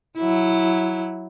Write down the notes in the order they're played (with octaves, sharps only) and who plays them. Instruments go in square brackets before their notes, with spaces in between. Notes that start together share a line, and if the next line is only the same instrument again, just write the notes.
[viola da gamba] F#3 E4